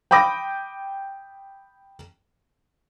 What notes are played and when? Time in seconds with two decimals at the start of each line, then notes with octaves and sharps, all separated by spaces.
0.11 G5 B5 D6 D#6 A#6